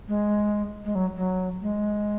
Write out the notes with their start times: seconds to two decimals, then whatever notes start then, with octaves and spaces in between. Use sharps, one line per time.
0.08 G#3
0.85 G#3
0.95 F#3
1.17 F#3
1.62 G#3